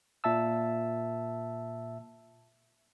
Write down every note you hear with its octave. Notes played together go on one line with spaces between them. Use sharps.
A#2 E5 A5 E6